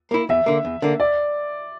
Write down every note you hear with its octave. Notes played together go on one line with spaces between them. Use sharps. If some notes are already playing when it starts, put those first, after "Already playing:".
A#3 E4
E2 E5
D3 A#3
E2
D3 A#3
D5